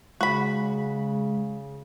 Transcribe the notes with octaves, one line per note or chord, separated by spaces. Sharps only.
C#3 G#3 F#4 B5